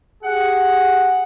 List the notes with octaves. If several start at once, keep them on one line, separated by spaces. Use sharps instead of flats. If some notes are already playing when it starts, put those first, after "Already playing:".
G4 G#4 F#5